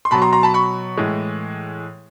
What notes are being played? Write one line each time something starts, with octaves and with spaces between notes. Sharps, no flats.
C6
B2 F#3 A5 B5
A#5 C6
A#5 C6
A5 B5
B5 C#6
A2 E3 G#3